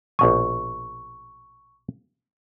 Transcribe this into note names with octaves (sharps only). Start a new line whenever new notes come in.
A#1 B2 G#5 C#6